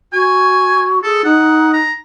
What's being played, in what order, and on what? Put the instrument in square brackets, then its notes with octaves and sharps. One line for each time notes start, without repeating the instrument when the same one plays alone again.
[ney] F#4 [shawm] G#5
[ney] G#4 [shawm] A4
[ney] D#4 [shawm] F#5
[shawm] A#5